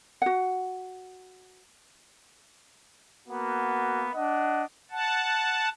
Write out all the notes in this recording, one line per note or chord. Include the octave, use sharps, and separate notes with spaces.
F#4 F#5
A#3 B3 F#4
D4 D#5 F#5
F#5 A5